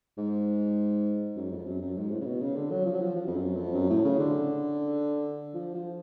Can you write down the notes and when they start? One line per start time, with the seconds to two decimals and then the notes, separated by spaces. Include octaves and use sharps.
0.18 G#2
1.36 F#2
1.52 F2
1.67 F#2
1.82 F#2
1.97 G#2
2.11 A2
2.21 C#3
2.26 B2
2.41 C#3
2.56 D3
2.71 F#3
2.86 F3
2.95 F#3
3.01 F3
3.16 F3
3.27 F2
3.36 F#2
3.56 F2
3.75 F#2
3.90 A2
4.05 C#3
4.20 D3
5.54 F3
5.75 F3